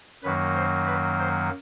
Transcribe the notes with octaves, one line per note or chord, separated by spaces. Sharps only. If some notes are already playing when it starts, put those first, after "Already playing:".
F#2 D#3 F#3 A#3 B4
C5
B4
C5